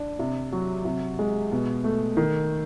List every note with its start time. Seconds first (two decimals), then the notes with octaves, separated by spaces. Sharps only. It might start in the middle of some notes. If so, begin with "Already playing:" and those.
Already playing: D4
0.19 C3
0.52 F#3
0.85 C3
1.19 G#3
1.52 B2
1.84 A3
2.17 D#3